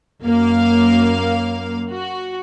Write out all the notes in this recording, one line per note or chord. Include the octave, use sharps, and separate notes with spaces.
F#2 A#3 F5
F#4